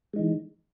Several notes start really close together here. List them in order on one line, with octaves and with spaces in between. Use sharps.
G#3 D#4 E3